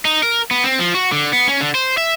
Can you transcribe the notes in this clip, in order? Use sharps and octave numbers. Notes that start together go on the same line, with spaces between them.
D#4
A#4
B3
C4
F3
F#4
D3
B3
C#4
D3
C5
E5